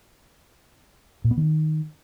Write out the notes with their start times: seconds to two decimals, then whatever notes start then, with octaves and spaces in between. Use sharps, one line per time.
1.24 A#2
1.31 B3
1.37 D#3